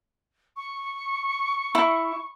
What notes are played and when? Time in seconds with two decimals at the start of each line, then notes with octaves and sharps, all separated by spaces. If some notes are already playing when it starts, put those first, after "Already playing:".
0.56 C#6
1.75 E4